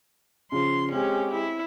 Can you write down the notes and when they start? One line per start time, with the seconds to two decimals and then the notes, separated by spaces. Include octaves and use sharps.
0.52 C#3 F3 C6
0.92 G#3 C4 C#4 G4
1.31 E4